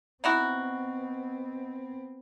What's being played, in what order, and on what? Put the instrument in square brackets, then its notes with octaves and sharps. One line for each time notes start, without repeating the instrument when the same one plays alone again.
[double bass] B3 C4 [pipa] D#4 E4 F#4